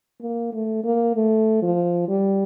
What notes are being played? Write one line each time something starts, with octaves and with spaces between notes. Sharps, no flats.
A#3
A3
A#3
A3
F3
G3